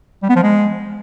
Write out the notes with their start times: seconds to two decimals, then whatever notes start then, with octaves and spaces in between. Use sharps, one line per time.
0.23 G3
0.29 B3
0.36 F3
0.43 G#3